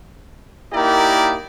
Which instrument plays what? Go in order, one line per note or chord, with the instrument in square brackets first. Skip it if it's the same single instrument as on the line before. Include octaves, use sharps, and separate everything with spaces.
[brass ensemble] A#3 D#4 E4 G4 A#4 D5